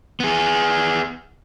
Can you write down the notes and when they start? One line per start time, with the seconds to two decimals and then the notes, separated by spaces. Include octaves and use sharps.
0.20 B3 G#4